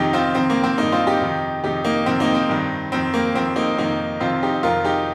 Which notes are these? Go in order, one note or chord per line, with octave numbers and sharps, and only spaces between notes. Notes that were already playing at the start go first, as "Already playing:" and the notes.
Already playing: F2 C3 D#3 D#4 G4
C4 F4
F2 C3 D#3 C4
A#3
C4
G2 D#3 A#3 D#4
C4 F4
D#4 G4
F2 C3 D#3
F2 C3 D#3 D#4 G4
A#3 D#4
F2 C3 D#3 C4
A#3 D#4
C4
G2 D#3
F2 D#3 C4
A#3
F2 D#3 C4
A#3 D#4
F2 C3 D#3 A#3 D#4
F2 C3 D#3 C4 F4
D#4 G4
F2 C3 D#3 F4 A#4
D#4 G4